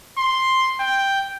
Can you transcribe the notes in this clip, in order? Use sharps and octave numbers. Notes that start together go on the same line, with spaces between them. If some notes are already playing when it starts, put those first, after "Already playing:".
C6
G5